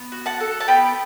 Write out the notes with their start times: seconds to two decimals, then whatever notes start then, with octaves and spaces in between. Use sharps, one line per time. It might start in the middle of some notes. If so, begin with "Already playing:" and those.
Already playing: B3
0.12 F#4
0.26 F#5 A5
0.40 A4
0.60 A5
0.68 B3 G5 B5